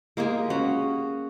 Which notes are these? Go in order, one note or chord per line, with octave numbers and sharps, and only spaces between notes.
G#3 A#3 G4 G#4
C#4 F#4